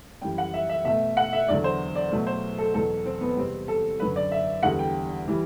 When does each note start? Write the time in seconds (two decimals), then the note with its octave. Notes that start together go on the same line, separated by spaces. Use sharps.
0.22 F#2 E3 G3 G5
0.38 F#5
0.54 E5
0.69 E5
0.85 B2 A3 E5
1.17 F#5
1.33 E5
1.48 E2 D3 F#3 D5
1.64 C5
1.95 D5
2.12 B2 F#3 A3
2.27 C5
2.58 A4
2.74 E2 B2 F#3 A4
3.05 C4
3.21 B3
3.37 E2 C3 G3 C4
3.68 A4
4.00 F#2 D3 F#3 B4
4.16 D5
4.32 E5
4.63 E2 D3 G3 F#5
4.79 G5
5.28 E3 G3